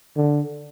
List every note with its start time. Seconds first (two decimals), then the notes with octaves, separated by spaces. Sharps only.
0.16 D3